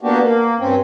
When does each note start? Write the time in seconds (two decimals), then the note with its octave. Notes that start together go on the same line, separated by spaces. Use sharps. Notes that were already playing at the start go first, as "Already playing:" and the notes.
0.01 A#3 B3 D4 F#4 G4
0.21 A#3
0.59 G2 C4 C#4